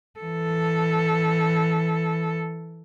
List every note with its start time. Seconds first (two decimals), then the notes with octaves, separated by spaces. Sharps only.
0.20 E3 A4